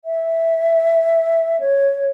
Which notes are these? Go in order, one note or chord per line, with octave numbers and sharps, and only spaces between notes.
E5
C#5